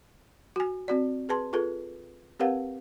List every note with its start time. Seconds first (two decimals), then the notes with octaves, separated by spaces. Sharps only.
0.56 F#4 G#5
0.88 C4 F#4 D5
1.29 G#4 B4 A5 C6
1.53 F4 G#4 A4 B4
2.40 C4 G4 A#4 B4 F5 F#5